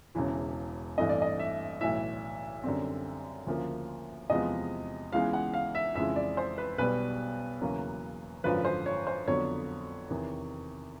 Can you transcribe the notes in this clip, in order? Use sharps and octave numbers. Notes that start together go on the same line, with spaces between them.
E1 E2 C#3 E3
A1 G2 E3 A3 C4 D#5
D5
D#5
E5
B1 A2 E3 E5
F#2 D3 G3 C4
D2 C#3 F3 A#3
E2 C3 F3 G#3 B3 D#5
C#2 C#3 E3 G#3 B3 F5
F#5
F5
E5
F2 C#3 E3 G#3 E5
D5
C5
B4
B1 B2 G3 B4
E2 C#3 F#3 A#3
G#1 F#2 D3 F3 B4
C5
C#5
C5
F2 D3 F#3 B3 C#5
E2 C3 D#3